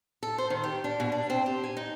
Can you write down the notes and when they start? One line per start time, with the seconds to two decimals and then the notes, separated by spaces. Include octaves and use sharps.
0.23 A4
0.38 C5
0.50 D#3
0.64 G4
0.84 D4
1.00 B2
1.12 D4
1.30 C4
1.46 G4
1.64 G#5
1.77 D#4